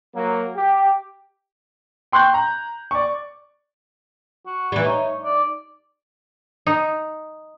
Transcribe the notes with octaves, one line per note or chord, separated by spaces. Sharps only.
F#3 A#3
G4
G5 C6 C#6 F#6 G6
A#5
D5 C#6
F#4
E3 G3
D#4 C#5
D5
D#4